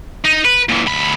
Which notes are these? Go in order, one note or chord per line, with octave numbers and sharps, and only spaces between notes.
D#4
B4
A#2 E3
D2 B5